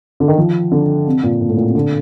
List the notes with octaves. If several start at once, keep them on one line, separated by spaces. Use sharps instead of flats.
D3
D#3
F3
D3
C3
A#2
A#2
A2
A#2
C3
D3